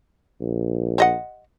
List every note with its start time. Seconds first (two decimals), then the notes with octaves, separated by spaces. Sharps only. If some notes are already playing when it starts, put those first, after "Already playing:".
0.40 A#1
0.98 C4 D#5 F#5